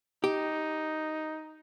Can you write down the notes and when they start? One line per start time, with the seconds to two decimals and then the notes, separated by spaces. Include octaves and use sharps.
0.24 D#4 G4